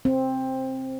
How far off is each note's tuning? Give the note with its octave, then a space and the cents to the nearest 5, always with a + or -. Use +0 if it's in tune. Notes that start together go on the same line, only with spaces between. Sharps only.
C4 +10